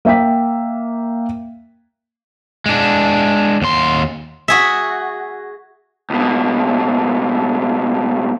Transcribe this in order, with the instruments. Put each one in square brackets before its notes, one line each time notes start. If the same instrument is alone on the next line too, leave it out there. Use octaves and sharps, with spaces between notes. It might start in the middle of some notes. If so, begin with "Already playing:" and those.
[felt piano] A#3 E5 G5 B6
[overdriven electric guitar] G#3 D4
D#2 C6
[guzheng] F#4 G#4 E5
[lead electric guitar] C#2 B2